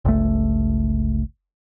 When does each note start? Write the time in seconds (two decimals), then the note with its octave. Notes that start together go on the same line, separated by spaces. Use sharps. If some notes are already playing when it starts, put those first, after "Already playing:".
0.05 G1 C#2 A3